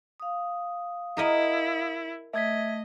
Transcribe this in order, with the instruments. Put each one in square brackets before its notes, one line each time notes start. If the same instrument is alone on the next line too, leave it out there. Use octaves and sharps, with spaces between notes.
[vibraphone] F5 D#6
[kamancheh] E4 [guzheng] G#4 A#4 D#5
[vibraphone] A3 [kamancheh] D#5 [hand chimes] E5 G#6 B6